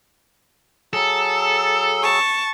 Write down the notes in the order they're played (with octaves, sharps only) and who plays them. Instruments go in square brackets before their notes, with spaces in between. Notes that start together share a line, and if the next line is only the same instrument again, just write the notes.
[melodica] F#3 G#4 E6 [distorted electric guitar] A4
[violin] A5 C#6